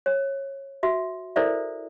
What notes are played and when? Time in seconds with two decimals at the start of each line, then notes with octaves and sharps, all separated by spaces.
0.06 C#5
0.83 F#4 E5
1.36 E4 A4 A#4 C5 D5 E5